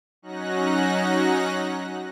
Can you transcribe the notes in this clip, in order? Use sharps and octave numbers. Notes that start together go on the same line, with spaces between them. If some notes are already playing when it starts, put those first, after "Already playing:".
F#3 C#4 D#4 F#4 F#6 A#6